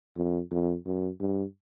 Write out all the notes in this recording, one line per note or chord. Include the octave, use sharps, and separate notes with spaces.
F2
F2
F#2
G2